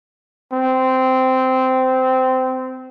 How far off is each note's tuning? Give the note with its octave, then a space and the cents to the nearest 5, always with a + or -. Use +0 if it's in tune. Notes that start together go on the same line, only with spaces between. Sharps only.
C4 -15